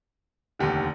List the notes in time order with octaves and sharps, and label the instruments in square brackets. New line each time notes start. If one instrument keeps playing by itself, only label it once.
[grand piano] F1 D#2 D3 G4